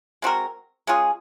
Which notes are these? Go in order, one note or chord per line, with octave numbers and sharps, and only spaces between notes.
G#3 C4 F#4 A#4
G#3 C#4 F4 G#4